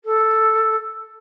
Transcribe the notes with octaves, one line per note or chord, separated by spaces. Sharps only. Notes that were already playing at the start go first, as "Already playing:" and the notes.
A4